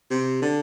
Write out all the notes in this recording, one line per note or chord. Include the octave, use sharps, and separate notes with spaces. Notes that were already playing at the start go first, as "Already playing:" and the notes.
C3
D3